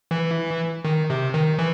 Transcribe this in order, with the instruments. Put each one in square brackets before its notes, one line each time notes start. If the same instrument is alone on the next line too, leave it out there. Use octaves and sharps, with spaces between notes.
[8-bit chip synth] E3
D#3
C3
D#3
E3